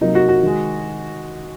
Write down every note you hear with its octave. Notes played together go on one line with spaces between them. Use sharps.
C3 F#3 A#3 D#4
F#4
F#4
D#3 G#3